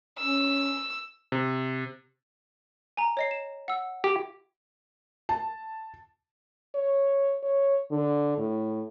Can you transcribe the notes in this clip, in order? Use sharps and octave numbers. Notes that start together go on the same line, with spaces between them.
C#4 E6
C3
G#5 A#5
C#5 D#5 C7
E7
F#5 E6
G4
A5
C#5
C#5
D3
A2